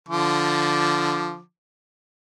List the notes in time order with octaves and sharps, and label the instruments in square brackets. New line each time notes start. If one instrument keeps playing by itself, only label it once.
[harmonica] D3 F3 D6